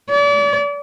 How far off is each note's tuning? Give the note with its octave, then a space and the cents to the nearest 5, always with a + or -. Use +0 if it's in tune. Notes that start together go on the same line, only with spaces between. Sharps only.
D5 -40